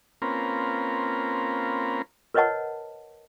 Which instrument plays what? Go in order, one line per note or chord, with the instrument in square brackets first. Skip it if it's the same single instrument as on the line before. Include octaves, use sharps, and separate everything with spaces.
[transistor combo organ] A#3 C4 C#4 F4 A#4 B4
[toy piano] A#4 B4 C#5 D#5 F#5 A5